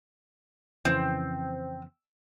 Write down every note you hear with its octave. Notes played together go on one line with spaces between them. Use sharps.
F2 C#3 E3 C4